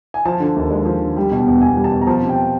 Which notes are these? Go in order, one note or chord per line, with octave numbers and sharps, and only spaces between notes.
G#5
F3 A5
D3
D#2
G#3
F3
D3
G3
B2
E2
E2 G#5
G3
A5
B2
A#5
F3 A5
C3
G5